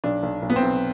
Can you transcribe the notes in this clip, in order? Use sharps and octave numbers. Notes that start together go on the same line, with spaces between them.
B1 D4
B1
B1
B3
C4
B1